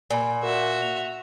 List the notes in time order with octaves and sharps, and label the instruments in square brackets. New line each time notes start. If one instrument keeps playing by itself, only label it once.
[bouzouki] A#2 [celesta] G#5 B5
[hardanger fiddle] F#4 E5 [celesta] A#4
[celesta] F7